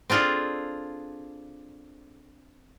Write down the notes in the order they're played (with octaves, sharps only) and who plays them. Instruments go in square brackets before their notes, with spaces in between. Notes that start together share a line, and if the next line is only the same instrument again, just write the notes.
[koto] C4 D4 F4 G#4 A4